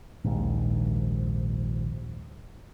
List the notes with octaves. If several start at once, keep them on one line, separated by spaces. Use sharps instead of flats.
A#1 D#2 G#2